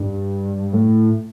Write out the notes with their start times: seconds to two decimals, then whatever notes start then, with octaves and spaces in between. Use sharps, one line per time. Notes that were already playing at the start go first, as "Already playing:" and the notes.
Already playing: G2
0.73 A2